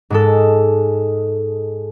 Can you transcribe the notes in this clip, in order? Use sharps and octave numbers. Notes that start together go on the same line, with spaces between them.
G#2 G#3 A4